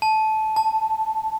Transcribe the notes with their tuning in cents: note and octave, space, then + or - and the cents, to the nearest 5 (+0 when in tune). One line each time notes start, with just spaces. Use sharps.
A5 -15
A5 +5